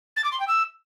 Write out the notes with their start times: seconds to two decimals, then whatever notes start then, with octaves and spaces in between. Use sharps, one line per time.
0.16 A6
0.24 D6
0.32 C6
0.40 G5
0.47 E6